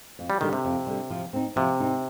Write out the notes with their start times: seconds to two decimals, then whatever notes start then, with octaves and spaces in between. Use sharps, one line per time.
0.19 F2
0.30 G3
0.41 D3 D#3 G3
0.53 C3
0.65 F2
0.87 D3 G3
1.10 F3
1.33 C4 D#4
1.56 C3 F3
1.80 C4 D#4